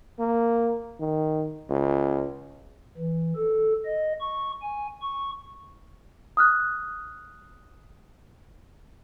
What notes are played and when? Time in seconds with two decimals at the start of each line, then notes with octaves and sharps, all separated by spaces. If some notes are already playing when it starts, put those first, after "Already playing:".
0.19 A#3
1.00 D#3
1.69 C#2
2.97 E3
3.36 A4
3.86 D#5
4.21 C#6
4.62 G#5
5.02 C#6
6.37 D#6 F6 F#6